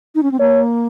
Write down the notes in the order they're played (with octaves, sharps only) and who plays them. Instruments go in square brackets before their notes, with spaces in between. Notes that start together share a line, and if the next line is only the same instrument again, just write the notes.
[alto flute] D#4
C#4
C4
[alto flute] A#3 [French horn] C#5